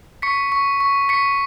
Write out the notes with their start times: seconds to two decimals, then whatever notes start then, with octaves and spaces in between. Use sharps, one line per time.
0.22 C#6 B6 C#7
0.52 C#6
0.80 C#6
1.09 C#6 B6 C#7